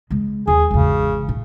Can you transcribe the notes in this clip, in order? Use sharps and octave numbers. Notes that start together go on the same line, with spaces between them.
C#3 G#3
D#2 D#3 G#4
G#1 E2 C#3
A2